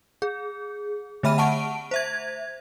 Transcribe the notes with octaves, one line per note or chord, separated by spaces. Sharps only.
G#4
D3 A3 E5 B5 F6 D#7
F#5 A5 C#6 D7
C5 E5 G#6